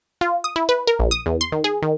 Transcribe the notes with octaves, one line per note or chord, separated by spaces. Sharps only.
F4
D#6
E4
B4
A#4
A#1
D#6
E2
C6
D#3
G#4
D#3